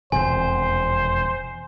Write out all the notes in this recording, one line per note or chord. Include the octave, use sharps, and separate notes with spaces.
E1 F2 C3 C5 G#5